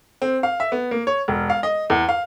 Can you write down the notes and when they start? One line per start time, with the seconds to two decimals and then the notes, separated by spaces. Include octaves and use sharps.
0.22 C4
0.43 F5
0.60 E5
0.72 B3
0.91 A#3
1.07 C#5
1.28 E1
1.50 F5
1.63 D#5
1.90 E2
2.09 F5